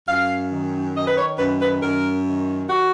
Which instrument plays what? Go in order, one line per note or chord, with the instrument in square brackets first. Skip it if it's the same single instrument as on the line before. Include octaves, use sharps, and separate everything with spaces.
[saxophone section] F#2 F5
D#3
D#3 D#5
B4
C#5
F#2 B4
B4
F#2 A#4
D#3
F#4